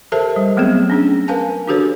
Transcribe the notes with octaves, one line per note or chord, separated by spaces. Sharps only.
G4 A4 A#4 C5 E5 A5
G3
F#3 A3 B3 C4 G#4
C#4 D4 G#4
A#4 B4 F5 G#5 A5
D4 F#4 G4 A4 B4 C#5